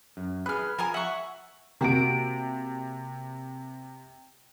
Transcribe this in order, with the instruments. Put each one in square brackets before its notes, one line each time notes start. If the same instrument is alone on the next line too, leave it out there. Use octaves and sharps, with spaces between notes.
[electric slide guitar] F#2
[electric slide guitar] G#4 B4 [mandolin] F6 F#6
[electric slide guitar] F3 [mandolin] A#4 G#5 F6
[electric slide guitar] E5 [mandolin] F#5 C#6
[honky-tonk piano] C3 D7 [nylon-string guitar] A#3 C4 F#4